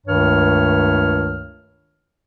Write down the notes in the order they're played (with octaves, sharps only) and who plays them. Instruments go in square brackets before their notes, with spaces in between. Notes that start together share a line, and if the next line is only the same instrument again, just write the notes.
[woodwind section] C#2 G2 D#3 A3 C#5 F6